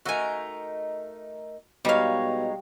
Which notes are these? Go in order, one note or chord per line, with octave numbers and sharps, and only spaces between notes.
A3 D#4 F#4 A#4 G#5
B2 G3 G#3 D#4 C#5 F5